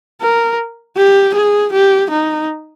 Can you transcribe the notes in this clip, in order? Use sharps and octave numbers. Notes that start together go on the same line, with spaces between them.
A#4
G4
G#4
G4
D#4